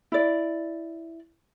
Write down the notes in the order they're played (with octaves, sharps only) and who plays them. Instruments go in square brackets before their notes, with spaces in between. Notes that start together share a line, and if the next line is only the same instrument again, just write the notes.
[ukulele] E4 D5